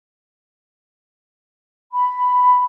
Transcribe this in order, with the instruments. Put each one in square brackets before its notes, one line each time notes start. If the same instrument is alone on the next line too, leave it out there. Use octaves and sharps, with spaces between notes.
[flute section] B5